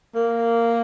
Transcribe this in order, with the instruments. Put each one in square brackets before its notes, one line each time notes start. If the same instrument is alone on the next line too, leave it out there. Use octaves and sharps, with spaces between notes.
[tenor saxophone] A#3